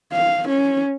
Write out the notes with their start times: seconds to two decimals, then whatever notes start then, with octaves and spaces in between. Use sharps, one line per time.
0.13 F5
0.49 C#4